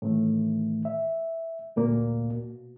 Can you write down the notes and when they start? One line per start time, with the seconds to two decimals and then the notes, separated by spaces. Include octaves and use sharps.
0.02 A2 D#3 E3 A3
0.85 E5
1.76 D2 A#2 A#3
2.31 B2